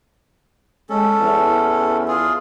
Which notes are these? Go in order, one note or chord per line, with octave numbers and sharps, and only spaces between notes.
G#3 C#4 A4
E2
F4 G#4